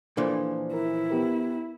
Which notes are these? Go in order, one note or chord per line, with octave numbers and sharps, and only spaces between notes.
A#2 E3 F3 A#3 D4 A4
E4 A#4
B3 G4 A#4